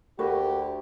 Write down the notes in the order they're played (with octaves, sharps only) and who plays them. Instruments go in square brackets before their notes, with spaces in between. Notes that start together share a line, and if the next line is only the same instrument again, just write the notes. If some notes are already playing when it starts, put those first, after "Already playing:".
[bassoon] D2 [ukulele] F#4 A#4 B4 [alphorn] G4